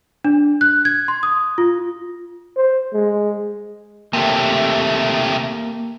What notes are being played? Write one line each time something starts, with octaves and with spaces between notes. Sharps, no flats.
D4
F#6
G#6
C6
D#6
F4
C5
G#3
C3 A3 A#3 G4